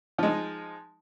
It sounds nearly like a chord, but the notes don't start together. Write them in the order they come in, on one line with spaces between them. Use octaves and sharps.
F3 G#3 D#4